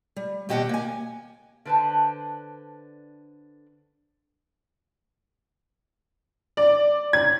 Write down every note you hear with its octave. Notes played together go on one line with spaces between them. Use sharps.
G3
D#2 B2 G4 D#5 F#5 G5
A#3 G#5
D3 D4 B4 C5 A5
D5
G#6